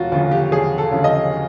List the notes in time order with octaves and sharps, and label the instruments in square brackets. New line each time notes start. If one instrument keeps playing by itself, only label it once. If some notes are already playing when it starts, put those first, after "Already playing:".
Already playing: [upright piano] E1 F4 F#4
D2 C#3 F3 F4
G4
E1 G#4
A4
D2 C#3 F3
D#5